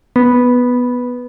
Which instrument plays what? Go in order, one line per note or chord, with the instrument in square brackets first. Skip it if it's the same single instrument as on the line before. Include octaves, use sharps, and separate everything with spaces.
[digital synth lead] B3